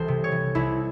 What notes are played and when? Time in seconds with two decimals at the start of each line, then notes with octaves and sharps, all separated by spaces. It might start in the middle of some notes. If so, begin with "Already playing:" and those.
Already playing: C2 E3 A4 C5
0.08 C3
0.24 C#5
0.32 E3
0.55 C2 E4